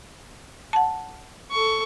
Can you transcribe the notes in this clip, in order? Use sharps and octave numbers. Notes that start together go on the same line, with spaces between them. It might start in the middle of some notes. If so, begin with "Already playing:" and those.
F#5 A5
A4 C#6